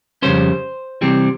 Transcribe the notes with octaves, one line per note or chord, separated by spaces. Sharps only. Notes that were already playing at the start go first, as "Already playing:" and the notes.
F2 C#3 G3 C#4 C5
C3 E3 G3 C4